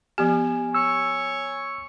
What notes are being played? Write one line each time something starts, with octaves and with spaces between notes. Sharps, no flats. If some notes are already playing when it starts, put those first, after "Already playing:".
F3 B3 G4 G#5
C#5 E6